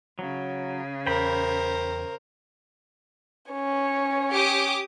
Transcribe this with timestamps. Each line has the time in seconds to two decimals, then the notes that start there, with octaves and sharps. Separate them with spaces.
0.19 C#3 F#3
1.07 E2 A#4 C5 G5 B5
3.51 C#4 C#5
4.33 G4 D6 D#6